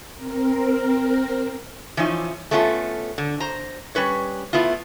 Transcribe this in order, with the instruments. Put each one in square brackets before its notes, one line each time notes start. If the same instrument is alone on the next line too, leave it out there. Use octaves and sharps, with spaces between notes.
[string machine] C4 A#4
[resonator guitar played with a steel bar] E3 F3 C#4 D#4
A3 B3 C#4 F4 F#4 A4
D3
C5 A#5
G3 C#4 B4 C#5
A3 B3 E4 F4